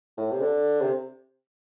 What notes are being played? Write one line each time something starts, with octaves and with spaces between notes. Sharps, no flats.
A2
C3
D3
C3